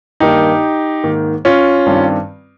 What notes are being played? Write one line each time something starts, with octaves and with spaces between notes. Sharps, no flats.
G2 D#3 A#3 D#4 G4
G#2 D#3 A#3
C#4 F4
G2 D#3 G3 C4